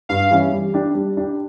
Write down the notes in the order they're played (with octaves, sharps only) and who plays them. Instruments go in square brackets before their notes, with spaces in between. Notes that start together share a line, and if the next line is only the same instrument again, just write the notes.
[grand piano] G2 [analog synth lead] F5
[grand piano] E3 G3 C#4
G3
D4 G4
G3
D4 G4